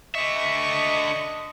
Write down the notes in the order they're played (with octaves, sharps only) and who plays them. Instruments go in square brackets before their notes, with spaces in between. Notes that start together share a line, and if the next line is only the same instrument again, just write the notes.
[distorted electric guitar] D3 E5 [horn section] D#5 [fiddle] C#6